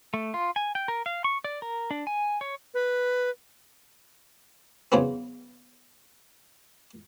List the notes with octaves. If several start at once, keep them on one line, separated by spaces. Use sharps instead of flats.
A3
F4
G#5
G5
A#4
F5
C#6
D5
A#4
D4
G#5
C#5
B4
E2 C#3 F#3 B3 C4